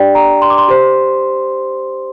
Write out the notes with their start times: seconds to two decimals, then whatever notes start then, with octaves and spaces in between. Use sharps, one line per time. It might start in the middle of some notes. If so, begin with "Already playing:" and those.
Already playing: D4 G4 D5 G5
0.15 A#5
0.42 C6
0.50 D6
0.58 C6
0.68 G4 C5